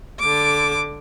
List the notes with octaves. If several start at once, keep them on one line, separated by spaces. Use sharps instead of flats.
D3 D6